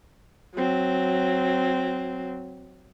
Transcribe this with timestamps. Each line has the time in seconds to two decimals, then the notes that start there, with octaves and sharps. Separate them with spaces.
0.55 F#3 C4